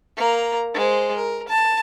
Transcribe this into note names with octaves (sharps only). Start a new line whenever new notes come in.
A#3 A#5
G#3 C5
A#4
A5